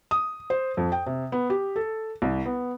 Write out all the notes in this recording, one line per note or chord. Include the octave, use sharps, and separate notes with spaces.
D#6
C5
F2
G5
C3
B3
G4
A4
C2
B3